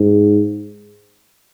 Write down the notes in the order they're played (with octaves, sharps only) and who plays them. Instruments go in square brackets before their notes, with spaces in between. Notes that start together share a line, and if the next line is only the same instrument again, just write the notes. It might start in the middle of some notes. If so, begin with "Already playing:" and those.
Already playing: [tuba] G#2